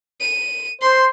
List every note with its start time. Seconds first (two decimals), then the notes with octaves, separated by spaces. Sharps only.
0.21 D#7
0.82 C5 C6